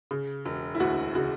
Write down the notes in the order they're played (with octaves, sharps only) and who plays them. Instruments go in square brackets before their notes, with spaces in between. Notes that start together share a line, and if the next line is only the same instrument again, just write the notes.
[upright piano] C#3
E1
E4
D2 F#4
C#3 F#4